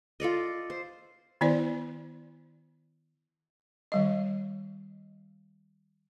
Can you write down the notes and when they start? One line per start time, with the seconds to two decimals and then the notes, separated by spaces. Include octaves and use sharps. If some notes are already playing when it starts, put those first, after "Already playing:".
0.20 F4 A4 D5 D#5
0.70 C5
1.41 D#3 B3 E4 C5 D5
3.92 D#3 G3 D#5